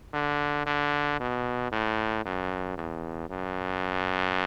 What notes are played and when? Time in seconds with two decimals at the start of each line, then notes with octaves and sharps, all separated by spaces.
0.13 D3
0.66 D3
1.20 B2
1.72 A2
2.25 F#2
2.77 E2
3.30 F#2